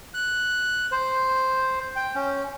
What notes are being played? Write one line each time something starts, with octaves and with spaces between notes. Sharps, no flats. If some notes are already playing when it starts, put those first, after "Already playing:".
F#6
C5
G5
C#4